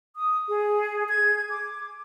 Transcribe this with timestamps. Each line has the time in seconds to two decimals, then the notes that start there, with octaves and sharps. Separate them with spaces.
0.16 D#6
0.49 G#4
1.09 G#6
1.50 D6